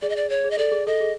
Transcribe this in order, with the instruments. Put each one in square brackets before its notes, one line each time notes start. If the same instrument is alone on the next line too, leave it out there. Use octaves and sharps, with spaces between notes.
[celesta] G#4 [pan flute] D5
[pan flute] D#5
D5
C#5
[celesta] G#4
[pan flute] D#5
[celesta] A4 [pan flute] D5
[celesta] G#4
[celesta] A4 [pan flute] D#5
[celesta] G#4